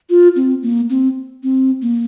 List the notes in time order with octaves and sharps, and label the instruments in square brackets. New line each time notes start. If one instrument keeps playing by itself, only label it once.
[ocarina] F4
C4
A#3
C4
C4
A#3